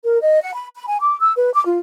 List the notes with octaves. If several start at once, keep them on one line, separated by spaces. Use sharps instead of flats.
A#4
D#5
F#5
B5
B5
G#5
D6
E6
B4
D6
F4